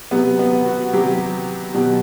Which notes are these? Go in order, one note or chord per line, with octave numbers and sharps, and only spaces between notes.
C3 F#3 B3
B3
F#4
C3 F#3 G4
B2 F#3 G4